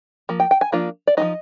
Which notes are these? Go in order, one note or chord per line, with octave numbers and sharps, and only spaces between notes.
F3 A#3
G5
G5
G#5
F3 A#3 D4 F4
D5
F3 C4 D#4 D#5